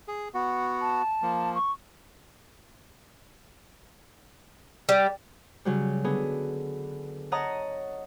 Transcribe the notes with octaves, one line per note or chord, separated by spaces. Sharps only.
G#4
B3 F#4
A5
F3 A#3
C#6
G3
C#3 F#3 G3
D3 B3 G#4
C#5 D#5 F#5 A5 A#5 D#6